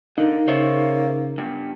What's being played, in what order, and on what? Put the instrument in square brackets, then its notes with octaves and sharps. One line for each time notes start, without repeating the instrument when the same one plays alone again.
[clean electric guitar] D3 [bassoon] A#3 [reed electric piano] D#4
[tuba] C#3 [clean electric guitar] C5 C#5 E5
[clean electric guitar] G2 B3